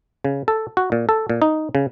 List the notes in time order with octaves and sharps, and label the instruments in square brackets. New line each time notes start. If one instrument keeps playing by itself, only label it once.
[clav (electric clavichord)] C#3
A4
F#4
A#2
A4
A#2
D#4
C#3